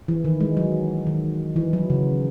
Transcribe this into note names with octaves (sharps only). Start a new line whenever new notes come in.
E3
D#3
G#3
F#3
D#3
E3
F#3
C#3